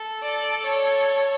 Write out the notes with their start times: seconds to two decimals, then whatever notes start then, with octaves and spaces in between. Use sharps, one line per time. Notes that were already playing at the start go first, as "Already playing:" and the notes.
Already playing: A4
0.23 D5
0.67 C#5